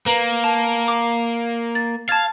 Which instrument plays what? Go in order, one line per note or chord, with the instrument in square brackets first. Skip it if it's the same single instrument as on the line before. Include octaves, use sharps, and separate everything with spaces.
[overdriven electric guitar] A#3 [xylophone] B4 A#5 F#7
[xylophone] A5
D6
A6
[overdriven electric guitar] F5 [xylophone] A5 G#6 A6